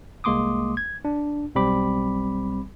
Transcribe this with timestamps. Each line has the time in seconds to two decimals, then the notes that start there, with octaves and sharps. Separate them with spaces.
0.24 C2 G#3 A#3 C6 D6 D#6
0.77 G#6
1.05 D4
1.55 B1 G3 C4 B5 D6